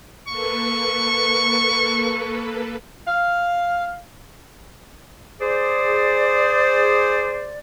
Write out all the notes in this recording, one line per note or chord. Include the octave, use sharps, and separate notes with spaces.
A#3 A4 B4 C#6
F5
G#4 C5 D5